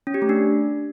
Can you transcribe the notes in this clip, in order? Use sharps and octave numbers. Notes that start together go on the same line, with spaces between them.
C#4
G4
A3
D4